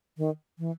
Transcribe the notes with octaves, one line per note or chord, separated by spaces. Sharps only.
D#3
E3